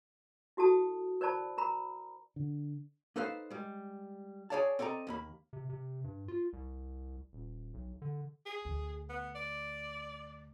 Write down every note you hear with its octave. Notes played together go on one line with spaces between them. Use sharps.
E4 F#4 A4 A5 D#6
A#4 C5 D5 A5 B5
A#4 A#5 B5
D3
A#3 D#4 A4 B4 C5 F5
G3 G#3
G#4 B4 C#5 D5 F5 A5
C4 A4 D5 D#5 A#5
D#2 A#3 B5
C3
C3
G2
F4
C2
D#1
B1
D3
G#4
D2
B3
D5